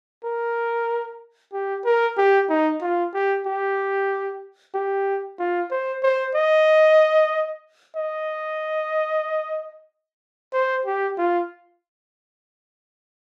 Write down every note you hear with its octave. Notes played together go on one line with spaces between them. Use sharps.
A#4
G4
A#4
G4
D#4
F4
G4
G4
G4
F4
C5
C5
D#5
D#5
C5
G4
F4